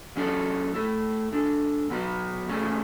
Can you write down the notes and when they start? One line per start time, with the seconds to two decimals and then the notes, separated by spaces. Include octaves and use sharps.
0.16 F#3 C#4 E4 A4
0.74 A3 E4 A4
1.32 G#3 D4 A4
1.90 B2 F#3 B3 F#4 B4
2.48 B2 A3 C#4 E4 G#4